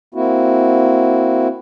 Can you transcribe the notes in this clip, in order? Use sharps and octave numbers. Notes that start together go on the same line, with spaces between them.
A#3 C4 E4 F#4